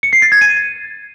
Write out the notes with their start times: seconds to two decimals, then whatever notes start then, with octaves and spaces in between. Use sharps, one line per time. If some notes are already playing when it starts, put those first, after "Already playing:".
0.03 C#7
0.13 C7
0.22 A6
0.32 G#6
0.41 D#7